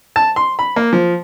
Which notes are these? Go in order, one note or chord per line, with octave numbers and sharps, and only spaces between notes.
A5
C6
B5
A#3
F3